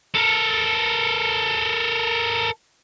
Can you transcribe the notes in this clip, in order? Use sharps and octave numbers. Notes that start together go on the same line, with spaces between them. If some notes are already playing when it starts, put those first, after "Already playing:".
A4 A#4